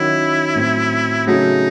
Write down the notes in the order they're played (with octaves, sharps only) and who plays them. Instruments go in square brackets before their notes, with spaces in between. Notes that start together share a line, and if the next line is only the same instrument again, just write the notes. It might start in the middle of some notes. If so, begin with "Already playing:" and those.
Already playing: [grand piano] D#3 F#3 C#4 F#4 [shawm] E4
[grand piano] A2 F#3 C4
[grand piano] C#3 F#3 A3 C#4 F#4 [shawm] D#4